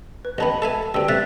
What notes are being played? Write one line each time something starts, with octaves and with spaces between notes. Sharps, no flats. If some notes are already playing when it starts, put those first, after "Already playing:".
B4
A1 D#3 B3 D#5 A5 B5
A4 E5 G#5 A5
D2 G2 G5 E6
C3 A3 E5 F#6 A6 B6